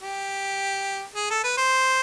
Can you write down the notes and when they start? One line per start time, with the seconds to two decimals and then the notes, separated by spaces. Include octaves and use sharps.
0.03 G4
1.16 G#4
1.30 A4
1.44 B4
1.58 C5